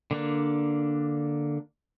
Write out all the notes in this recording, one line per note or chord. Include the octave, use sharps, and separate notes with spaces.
D3 A#3 D4